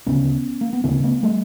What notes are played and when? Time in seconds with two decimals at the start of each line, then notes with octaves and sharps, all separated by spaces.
0.07 D2 C#3 B3 C#4
0.61 A#3
0.73 B3
0.84 D2 C#3 A#3 C4
1.03 A3 B3
1.23 G3 A3